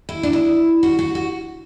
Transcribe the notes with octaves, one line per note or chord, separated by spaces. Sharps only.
E4
D4
E4
F#4
F#4
F#4